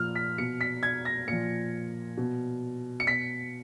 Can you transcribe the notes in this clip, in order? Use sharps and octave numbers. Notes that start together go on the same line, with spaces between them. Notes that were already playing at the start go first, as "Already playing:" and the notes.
Already playing: A#2 F3 F6
B6
B2 C#7
B6
G#6
A#6
A#2 F3 C#7
B2
C#7
B2 B6